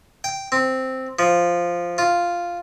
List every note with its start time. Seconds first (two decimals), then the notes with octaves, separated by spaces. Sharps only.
0.24 G5
0.52 C4
1.19 F3
1.98 F4